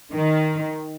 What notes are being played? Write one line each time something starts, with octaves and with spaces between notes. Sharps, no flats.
D#3